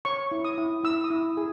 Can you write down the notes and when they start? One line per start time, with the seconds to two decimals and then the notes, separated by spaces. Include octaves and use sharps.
0.05 C#5 C#6
0.31 E4
0.45 D#6
0.58 E4
0.84 E4 E6
1.04 D#6
1.11 E4
1.37 G#4